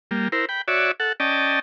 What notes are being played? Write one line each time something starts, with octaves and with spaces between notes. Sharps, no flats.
G3 A#3
E4 A#4 C5
G5 B5
F#4 C#5 D5 E5
A4 F#5
C#4 D5 D#5 G5 A5